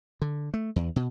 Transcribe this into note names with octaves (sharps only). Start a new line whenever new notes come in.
D3
A3
E2
B2